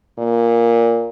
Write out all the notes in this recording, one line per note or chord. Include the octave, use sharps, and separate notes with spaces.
A#2